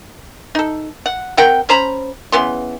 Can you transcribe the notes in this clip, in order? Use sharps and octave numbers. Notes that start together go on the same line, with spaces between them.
D#4 A4
F#5
C4 A#4 F#5 G5
C#4 C5 A#5 B5
C#3 E3 B3 C6